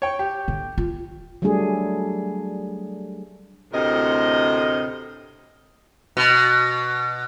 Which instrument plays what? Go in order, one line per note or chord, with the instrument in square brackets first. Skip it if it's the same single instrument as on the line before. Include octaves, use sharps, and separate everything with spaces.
[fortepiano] C#5 G5
G4
[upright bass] D3
F4
[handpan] F#3 G3 A3 D4 G#4
[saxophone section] D2 A2 C3 A#4 C5 D#5
[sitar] B2